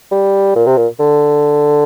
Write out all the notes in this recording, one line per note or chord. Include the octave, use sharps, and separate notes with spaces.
G3
A#2
C3
A#2
D3